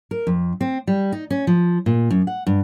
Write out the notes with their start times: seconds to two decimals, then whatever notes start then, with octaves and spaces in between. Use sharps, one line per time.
0.11 A#4
0.27 F2
0.61 C4
0.87 G3
1.12 D#4
1.30 C#4
1.47 F3
1.86 A#2
2.10 F#2
2.27 F#5
2.47 G2